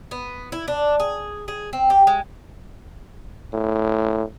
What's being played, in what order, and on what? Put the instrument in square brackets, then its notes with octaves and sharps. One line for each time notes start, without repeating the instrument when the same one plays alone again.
[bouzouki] B3
E4
D4
G#4
G#4
C4
G4
G#3
[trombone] A2